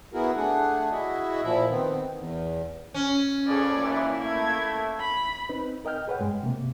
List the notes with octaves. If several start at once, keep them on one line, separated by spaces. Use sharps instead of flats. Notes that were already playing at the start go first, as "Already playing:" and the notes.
B3 E4 F#4 G#4 A#4
A3 D4 G#4 F#5
E4 F#4 G#4 D#5 E5
A#2 F3 E4 E5
D#3 B3 C4
E2
C#4
F2 C#3 G#4 A4 C#5 D5
G#1 C#2 E3 A#3 E4
A3 G#6
B5
C4 D#4 B4
A#4 D#5 G5 F6 G6
G#4 B4 C#5 F#5
G2 G#3 G5
C3 A#3